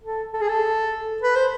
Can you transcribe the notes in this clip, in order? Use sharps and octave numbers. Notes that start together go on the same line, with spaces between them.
A4
A4
G#4
A4
B4
C5